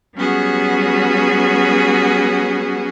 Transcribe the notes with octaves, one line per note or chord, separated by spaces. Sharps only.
F#3 G3 B3 C#4 F#4 G#4